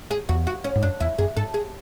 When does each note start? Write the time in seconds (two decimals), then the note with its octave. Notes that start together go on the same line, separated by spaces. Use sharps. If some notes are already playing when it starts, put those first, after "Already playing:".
0.11 G#4
0.29 E2 F#4
0.47 F#4
0.64 C#4
0.76 G#2
0.83 F#2 D4
1.00 E2 E4
1.18 F#2 G#4
1.37 G#2 A4
1.54 G#4